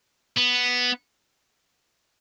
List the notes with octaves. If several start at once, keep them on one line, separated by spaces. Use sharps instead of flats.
B3